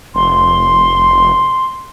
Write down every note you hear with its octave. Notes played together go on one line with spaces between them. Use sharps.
F1 C6